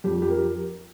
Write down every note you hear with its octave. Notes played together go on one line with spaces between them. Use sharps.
F2 G4
G4
A#4